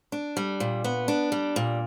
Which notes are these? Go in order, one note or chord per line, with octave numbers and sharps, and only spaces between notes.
D4
G3
A#2
B3
D4
G3
A#2